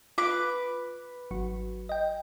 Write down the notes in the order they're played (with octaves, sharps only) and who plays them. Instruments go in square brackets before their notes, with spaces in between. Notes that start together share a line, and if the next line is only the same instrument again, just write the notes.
[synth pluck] F4 [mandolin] B4 D6
[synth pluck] G#1 F#3 F#4
D#5 G5